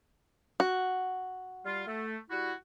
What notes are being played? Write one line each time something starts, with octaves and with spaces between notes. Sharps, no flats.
F#4
G3 F4
A3
G3 E4 F#4